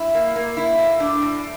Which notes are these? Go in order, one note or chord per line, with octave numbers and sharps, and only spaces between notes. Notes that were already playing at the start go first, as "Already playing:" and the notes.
Already playing: E4
A#3
A#3
E4
A2
D4
A2